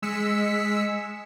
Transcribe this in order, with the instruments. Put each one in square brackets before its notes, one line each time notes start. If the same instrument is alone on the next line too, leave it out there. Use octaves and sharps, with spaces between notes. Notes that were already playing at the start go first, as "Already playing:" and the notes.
[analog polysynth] G#3 E6 B6 C#7